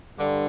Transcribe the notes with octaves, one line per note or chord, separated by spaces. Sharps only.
G2 D3